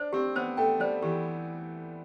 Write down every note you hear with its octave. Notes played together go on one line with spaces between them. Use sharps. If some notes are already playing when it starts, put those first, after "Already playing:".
Already playing: D4 C5
C4 G4
B3 C5
A3 G5
G3 C5
E3 G4